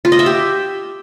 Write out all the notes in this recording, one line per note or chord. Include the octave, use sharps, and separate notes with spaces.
F4
D#5
E5
G4